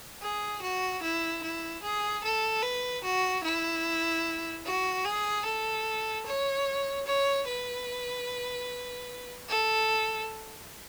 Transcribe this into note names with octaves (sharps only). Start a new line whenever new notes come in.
G#4
F#4
E4
E4
G#4
A4
B4
F#4
E4
F#4
G#4
A4
C#5
C#5
B4
A4